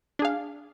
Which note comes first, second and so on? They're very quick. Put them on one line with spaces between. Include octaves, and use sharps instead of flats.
D4 G#4 F5